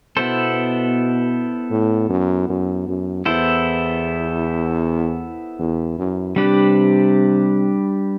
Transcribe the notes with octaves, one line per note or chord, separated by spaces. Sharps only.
B2 B3 E4 A4 C5
A2
F#2
F#2
F#2
E2 B3 E4 A4 C5
E2
F#2
C3 G3 D4 G4 B4